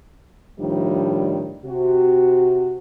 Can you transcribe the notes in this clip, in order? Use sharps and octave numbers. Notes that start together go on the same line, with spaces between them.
A2 D#3 F3 G3 D4
C3 F#4